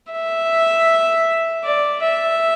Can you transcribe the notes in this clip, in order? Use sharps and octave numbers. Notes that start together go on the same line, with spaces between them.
E5
D5
E5